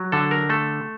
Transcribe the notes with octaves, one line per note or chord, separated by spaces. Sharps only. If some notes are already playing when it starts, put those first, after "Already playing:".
Already playing: F#3
D3 A4
A#4
A3 A4